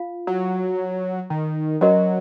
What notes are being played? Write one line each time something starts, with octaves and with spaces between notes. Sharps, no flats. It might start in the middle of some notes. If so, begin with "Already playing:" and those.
Already playing: F4 F5
F#3
D#3
F#3 C#4 F#4 A#4 D#5 A#5